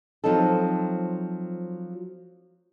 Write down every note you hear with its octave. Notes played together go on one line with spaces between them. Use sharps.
F3 F#3 C4 D#4 A4